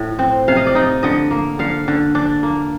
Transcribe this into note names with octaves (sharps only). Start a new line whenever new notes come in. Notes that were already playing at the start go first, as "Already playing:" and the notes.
Already playing: A2
C4
C3 F5
D#5
D5
D#4 D#5
D3 D#5
A#3
D3 F5
D3
D4
A#3